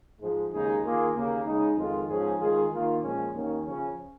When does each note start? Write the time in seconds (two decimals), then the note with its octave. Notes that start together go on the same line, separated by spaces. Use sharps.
0.21 G#2 F3 G#3
0.52 D#2 C#3 G#3 D#4 G#4
0.83 D#3 A#3 F4 G#4
1.15 D#2 C#3 A#3
1.45 C#3 G#3 D#4
1.77 F2 D#3 G#3 F4
2.08 G#2 F3 C#4 G#4
2.40 D#3 G#3 F4 G#4
2.71 D#3 A#3 F4
3.02 A#2 F3 G#3 C#4
3.33 D#2 D#3 A#3 C#4
3.65 C#3 F3 C#4